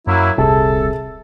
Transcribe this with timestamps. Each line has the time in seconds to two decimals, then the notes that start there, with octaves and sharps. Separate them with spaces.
0.07 F#2 F#3 A#3 E4
0.38 D#1 C2 C3 G#4 A4 A5